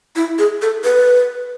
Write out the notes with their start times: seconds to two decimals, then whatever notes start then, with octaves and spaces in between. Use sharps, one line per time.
0.16 E4
0.39 G#4
0.62 A4
0.84 B4